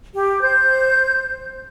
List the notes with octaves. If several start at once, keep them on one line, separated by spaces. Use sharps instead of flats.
G4
C5 G6